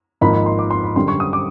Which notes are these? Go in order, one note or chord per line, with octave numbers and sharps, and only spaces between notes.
G#1 G#2 F3 A#3 D#4 B5
B5
C6
D6
C6
B5
F#2 D3 G3 C6
C#6
D#6
D6